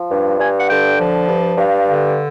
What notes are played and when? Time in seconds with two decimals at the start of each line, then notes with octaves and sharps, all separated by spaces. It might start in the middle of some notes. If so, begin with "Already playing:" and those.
Already playing: F3
0.11 G2
0.40 G2 G#5
0.59 F#5
0.69 D3 G5
0.99 F3
1.28 G2
1.57 G2 F5
1.87 D3